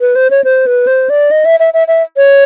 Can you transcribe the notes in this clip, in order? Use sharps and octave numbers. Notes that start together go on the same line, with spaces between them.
B4
C5
C#5
C5
B4
C5
D5
D#5
E5
E5
E5
E5
C#5